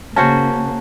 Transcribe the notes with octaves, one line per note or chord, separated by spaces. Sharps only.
C#3 A#3 C#4 F#4 C5 A5